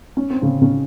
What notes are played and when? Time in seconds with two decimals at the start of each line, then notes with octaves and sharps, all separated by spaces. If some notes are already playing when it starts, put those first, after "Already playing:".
0.17 C#4
0.30 C4
0.42 C#3 C#4
0.61 C#3 C#4